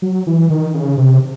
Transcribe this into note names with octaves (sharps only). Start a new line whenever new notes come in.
F#3
E3
D#3
C#3
C3